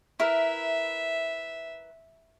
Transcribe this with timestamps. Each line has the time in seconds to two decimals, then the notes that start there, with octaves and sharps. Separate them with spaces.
0.20 E4 A#4 B4 E5